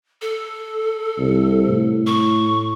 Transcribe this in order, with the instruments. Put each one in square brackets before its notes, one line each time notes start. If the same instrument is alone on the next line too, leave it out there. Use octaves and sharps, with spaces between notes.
[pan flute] A4
[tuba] C2
A2
[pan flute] C#6